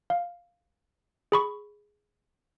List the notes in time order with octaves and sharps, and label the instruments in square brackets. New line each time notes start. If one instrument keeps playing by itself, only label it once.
[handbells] F5
G#4 B5 C#6